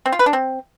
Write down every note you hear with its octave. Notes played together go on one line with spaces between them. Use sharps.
C4
F4
B4
D4
C4